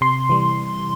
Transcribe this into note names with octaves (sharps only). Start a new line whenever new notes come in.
C3 C6
E3 G3